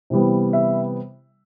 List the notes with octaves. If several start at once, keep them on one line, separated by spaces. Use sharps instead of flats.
C3 E3 G3 B3
E5